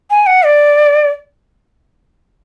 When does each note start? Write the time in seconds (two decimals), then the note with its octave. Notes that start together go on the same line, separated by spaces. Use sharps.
0.10 G#5
0.27 F#5
0.45 D5